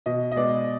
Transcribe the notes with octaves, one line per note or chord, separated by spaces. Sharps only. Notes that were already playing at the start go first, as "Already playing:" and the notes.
B2 D#5
D#5
G#3 B3 D5